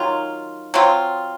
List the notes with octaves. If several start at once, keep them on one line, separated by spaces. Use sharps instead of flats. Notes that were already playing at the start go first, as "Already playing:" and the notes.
Already playing: D#3 F#3 F4
F#3 C4 F4